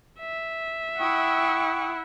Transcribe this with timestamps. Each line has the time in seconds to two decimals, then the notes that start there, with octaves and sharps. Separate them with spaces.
0.20 E5
0.99 E4 F#5 G5 C#6 D#6